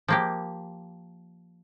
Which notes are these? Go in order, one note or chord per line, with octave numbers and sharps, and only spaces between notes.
F3 A#3 G4